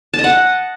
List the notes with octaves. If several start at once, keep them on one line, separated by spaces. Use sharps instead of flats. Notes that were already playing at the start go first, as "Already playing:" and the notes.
A5
D#5
F#5